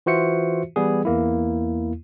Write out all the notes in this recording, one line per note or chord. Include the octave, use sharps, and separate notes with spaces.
E3 F4 F#4 C5 E5 C#7
E3 G3 B3 G#4
E2 A#3 E4